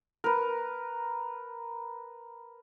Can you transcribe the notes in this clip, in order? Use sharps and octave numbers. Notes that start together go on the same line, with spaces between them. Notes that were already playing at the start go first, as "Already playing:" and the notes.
A#4 B4